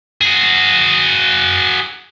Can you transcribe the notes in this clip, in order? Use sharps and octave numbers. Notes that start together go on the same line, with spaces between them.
F#4 G#4